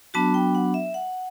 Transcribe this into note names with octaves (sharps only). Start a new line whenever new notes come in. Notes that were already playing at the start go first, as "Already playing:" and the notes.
F#3 B3 D4 F#4 A5
G5
F#5
E5
F#5